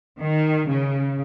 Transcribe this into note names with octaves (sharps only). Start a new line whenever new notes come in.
D#3
C#3